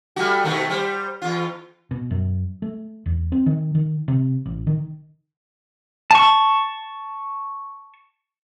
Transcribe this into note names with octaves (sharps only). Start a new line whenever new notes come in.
G3 A3 F#4
B2 D#3 A3
G3 C5
E2 F4
B2
F#2
A3
E2
C4
D#3
D#3
C3
A1
D#3
A5 C#6